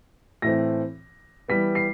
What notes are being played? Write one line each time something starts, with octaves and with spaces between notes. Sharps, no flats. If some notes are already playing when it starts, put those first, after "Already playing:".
A2 E3 A3 C4 A#6
E3 G3 B3 B6
C7